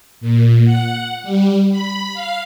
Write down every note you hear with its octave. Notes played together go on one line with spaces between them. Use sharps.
A#2
F#5
G3
B5
F5